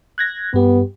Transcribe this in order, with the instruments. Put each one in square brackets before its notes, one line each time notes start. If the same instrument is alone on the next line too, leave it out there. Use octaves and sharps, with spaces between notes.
[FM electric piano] F#6 G#6 A#6
[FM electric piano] G2 G4 [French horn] B3